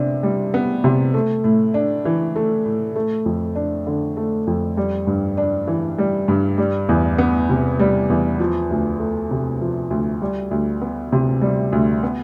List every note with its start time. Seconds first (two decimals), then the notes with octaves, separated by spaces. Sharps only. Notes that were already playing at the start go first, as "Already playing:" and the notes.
Already playing: C3 B3 D4
0.23 G3
0.54 B3
0.84 C3
1.14 A3
1.44 A2
1.74 D4
2.05 E3
2.36 A3
2.66 A2
2.96 A3
3.26 F2
3.55 D4
3.87 D3
4.17 A3
4.47 F2
4.77 G3
5.07 G2
5.37 D4
5.68 E3
5.98 G3
6.28 G2
6.58 G3
6.89 E2
7.18 B3
7.49 C3
7.79 G3
8.10 E2
8.40 F3
8.71 D2
9.00 A3
9.31 C3
9.61 F3
9.91 D2
10.22 G3
10.51 D2
10.82 B3
11.12 C3
11.41 G3
11.72 D2
12.03 B3